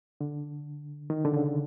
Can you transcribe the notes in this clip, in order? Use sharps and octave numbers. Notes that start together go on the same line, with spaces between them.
D3
D#3
D3
C#3